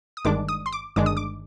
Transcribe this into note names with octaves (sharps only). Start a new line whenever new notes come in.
D#6
G1 G2 D#3 G#3 D4 D6
D#6
C6
D6
G1 G2 D#3 G#3 D4 D6
D#6
D6